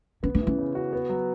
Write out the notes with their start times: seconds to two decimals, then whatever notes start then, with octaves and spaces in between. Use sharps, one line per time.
0.23 B3 C#4
0.35 D4
0.40 E3
0.47 C#4
0.59 C#3
0.75 F#4
0.93 B3
1.09 F#3